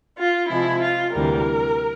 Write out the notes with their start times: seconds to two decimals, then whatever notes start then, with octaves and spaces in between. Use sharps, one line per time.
0.17 F4
0.49 C3 F3 G#3 E4
0.81 F4
1.13 D2 C3 E3 G3 A#4